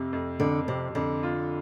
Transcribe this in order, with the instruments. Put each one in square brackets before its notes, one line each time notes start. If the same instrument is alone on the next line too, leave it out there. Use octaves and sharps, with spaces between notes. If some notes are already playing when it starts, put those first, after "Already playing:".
Already playing: [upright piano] F2 C3
F2
[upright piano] F2 [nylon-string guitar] D3
[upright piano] F2 [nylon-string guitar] C3
[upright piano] F2 [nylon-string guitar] D3
[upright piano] F4